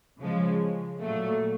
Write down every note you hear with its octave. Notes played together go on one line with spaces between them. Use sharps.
C#3 F3 G#3
A#2 F#3 A3